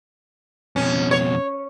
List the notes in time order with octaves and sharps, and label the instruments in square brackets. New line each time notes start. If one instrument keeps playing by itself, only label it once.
[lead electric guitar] F2 B2 [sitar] C#4
[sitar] C#5